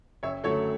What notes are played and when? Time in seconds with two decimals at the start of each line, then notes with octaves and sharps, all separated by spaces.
0.23 F#1 C#5 E5
0.44 F#2 D3 F#3 A3 A4 C#5